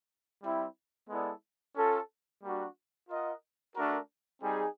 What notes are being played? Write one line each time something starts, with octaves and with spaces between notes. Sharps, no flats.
G3 C4 E4
G#3 B3 E4 A4 D5
C#4 F4 A4
G3 A#3 D4 F#4
F4 A#4 D#5 F#5
A3 D4 F#4 A#4
G3 C4 D#4 G#4